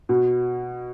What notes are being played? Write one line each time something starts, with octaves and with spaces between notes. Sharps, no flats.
B2